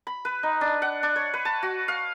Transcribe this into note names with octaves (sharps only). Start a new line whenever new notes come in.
B5
B4
D#4
D4
F#5
D4
C#5
B4
A5
F#4
F5